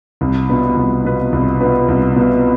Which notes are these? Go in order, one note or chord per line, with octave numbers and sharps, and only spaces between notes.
C2
B2 B3 F4 B4
C2
B2 B3 F4 B4
C2
B2 B3 F4 B4
C2
B2 B3 F4 B4